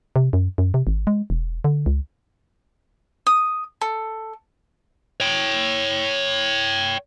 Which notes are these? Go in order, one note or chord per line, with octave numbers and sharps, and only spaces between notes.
C3
F#2
F#2
C3
G#1
G#3
E1
D3
C#2
D#6
A4
C#5 G5